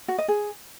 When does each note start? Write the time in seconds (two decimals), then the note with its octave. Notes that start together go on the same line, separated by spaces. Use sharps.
0.08 F#4
0.18 D#5
0.28 G#4